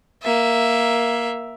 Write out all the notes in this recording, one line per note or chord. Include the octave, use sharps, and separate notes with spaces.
A#3 E5